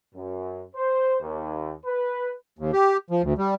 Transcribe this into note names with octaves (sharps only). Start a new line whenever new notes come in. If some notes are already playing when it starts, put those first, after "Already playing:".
F#2
C5
D#2
B4
D#2
G4
F3
D2
G3